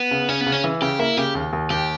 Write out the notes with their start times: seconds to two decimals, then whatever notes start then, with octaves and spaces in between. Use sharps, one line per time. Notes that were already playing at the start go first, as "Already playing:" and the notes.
Already playing: B3
0.11 C#3
0.29 C#3 C#4
0.41 B3
0.46 C#3
0.52 C#4
0.64 E3
0.82 C#3 G4
0.99 A#3 E4
1.17 C#3 G4
1.35 D#2
1.53 D#2
1.70 D#2 G4